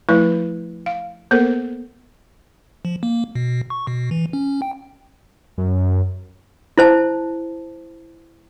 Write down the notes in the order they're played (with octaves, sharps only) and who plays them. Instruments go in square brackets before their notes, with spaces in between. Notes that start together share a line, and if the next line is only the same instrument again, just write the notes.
[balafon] F3 A3 E4 B4
F5
A#3 B3 A4 A#4 C5
[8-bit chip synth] F3
A#3
B2
C#6
B2
E3
C#4
G5
[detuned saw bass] F#2
[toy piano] E4 C5 A5